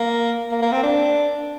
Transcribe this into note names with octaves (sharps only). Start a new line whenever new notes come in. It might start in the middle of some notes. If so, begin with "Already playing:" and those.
Already playing: A#3
A#3
A#3
C4
D4